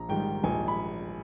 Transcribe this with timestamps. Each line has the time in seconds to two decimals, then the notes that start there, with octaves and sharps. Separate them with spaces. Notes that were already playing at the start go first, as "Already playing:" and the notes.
Already playing: A#1 A#5
0.09 G#2 D#3 G3 G5
0.44 A#1 G#5
0.68 B5